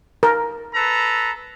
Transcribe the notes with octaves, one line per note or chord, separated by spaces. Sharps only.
A#4
A4 B4 A#5